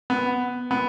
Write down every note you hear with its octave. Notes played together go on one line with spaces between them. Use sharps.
B3
B3